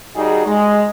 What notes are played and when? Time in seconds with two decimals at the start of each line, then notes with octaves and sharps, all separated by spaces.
0.15 D#3 G3 D#4 F#4 G#4
0.46 G#3